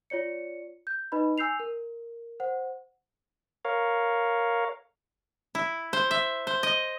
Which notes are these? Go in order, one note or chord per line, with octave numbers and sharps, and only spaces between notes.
F4 C#5 D5 C#7
G6
D#4 B4 D#5 B5
G#5 E6 G6 C7 F7
A#4
C5 F#5
A#4 C#5 F5
E4
C5
E5
C5
D#5